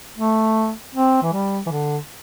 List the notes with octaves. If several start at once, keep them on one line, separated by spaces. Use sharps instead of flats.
A3
C4
E3
G3
E3
D3